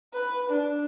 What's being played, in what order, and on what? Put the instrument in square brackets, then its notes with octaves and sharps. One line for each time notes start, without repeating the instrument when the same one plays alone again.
[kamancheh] B4
D4